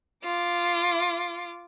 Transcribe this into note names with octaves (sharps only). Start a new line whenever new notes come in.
F4 D6